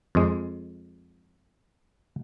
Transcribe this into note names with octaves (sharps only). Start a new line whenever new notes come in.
F2 G#3